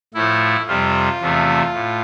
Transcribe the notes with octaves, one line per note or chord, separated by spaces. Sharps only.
A2 F3 A3 E4
F2 C3 G3 F4
E2 C3 F3 A3
A2